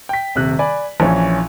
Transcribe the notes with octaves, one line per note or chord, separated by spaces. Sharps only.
G5 B6
D#1 C3 F#6
D5 G#5 B5
A#1 E3 C#4